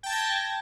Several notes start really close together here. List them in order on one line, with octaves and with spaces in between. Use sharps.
G5 A5 G#6 A#6